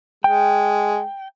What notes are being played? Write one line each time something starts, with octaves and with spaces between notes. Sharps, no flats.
G#3 G5